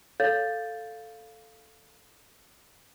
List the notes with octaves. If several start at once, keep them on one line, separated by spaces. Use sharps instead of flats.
A4 C#5 F5 G6 A6